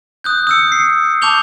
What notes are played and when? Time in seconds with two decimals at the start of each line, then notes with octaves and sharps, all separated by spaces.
0.24 D#6 F#6 G6
0.47 D#6 E6 C#7
0.72 C7
1.22 A5 C#6 D6 G6 F7 G7